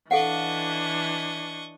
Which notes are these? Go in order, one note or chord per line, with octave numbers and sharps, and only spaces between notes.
E3 D4 A4 D#5 F5 F#5 C#6